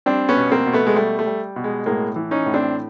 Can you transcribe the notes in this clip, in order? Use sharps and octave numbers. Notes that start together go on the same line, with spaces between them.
G3 C4 D4
B3 C#4
B2
A#3 C4
B2
A3 B3
G#3
G3 A3
A3
G3
B2
G#3
A2 G#3 A#3
E3
C#4 D#4
A2
C4 D4